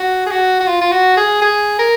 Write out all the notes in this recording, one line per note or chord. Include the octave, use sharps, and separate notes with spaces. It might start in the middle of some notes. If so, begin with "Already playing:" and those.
Already playing: F#4
G#4
F#4
F#4
F4
F4
F#4
G#4
G#4
A#4